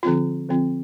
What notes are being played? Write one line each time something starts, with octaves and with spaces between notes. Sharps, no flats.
D3 F3 C4 F4
D3 F3 C4 F4